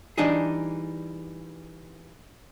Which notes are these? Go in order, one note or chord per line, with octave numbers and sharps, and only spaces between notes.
E3 G3 D4 D#4 G#4